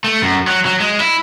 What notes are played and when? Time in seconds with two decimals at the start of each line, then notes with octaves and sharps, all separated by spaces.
0.04 A3
0.22 F#2
0.47 F#3
0.65 F#3
0.80 G#3
1.00 E4